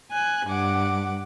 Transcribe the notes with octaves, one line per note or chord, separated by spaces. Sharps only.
G#5 F#6 G#6
G2 F#5 D6